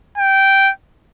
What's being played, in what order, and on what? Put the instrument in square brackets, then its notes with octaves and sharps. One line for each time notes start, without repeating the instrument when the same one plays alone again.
[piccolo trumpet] G5